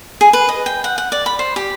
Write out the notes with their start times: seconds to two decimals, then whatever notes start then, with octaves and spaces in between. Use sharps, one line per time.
0.21 G#4
0.33 B4
0.49 D#5
0.66 G5
0.84 F#5
0.98 F#5
1.12 D5
1.26 B5
1.39 C5
1.56 G4